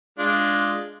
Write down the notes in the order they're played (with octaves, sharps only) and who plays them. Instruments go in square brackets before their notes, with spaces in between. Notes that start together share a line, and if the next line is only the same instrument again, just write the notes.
[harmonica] G#3 D4 F4